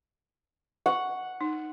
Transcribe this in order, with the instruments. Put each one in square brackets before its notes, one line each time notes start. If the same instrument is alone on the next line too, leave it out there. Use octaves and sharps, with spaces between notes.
[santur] F#5 [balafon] C#6
[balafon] D#4